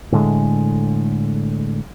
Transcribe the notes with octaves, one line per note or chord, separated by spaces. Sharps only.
A2 D3 G#3